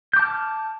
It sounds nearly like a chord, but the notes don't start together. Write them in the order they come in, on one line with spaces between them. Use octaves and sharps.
G6 D6 A5 F6